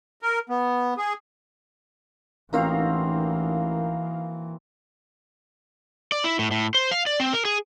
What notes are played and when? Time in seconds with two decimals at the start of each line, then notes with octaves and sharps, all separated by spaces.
0.22 A#4
0.50 B3
0.98 G#4
2.53 A1 E3 A#3 C4 D#4 F#4 A#4 F5
6.12 D5
6.24 E4
6.39 A2
6.51 A2
6.74 C5
6.91 F5
7.06 D5
7.20 C4
7.33 A#4
7.45 G#4